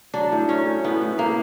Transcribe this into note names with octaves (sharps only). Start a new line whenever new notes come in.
F#3 D4
A2
F#3 C#4
A2
A2 B3
A2
A2 A#3